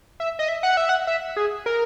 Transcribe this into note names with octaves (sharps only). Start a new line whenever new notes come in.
E5
D#5
E5
F#5
E5
F#5
E5
G#4
A#4